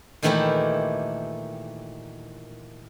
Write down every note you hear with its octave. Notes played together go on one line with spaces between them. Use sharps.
A#2 D#3 E3 A3 E4 G4